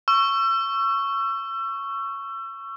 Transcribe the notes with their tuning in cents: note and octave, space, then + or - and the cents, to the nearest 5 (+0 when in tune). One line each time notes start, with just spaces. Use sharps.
C#6 +0 E6 +35